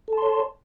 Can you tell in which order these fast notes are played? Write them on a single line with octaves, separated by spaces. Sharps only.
A4 A5 C6 C#5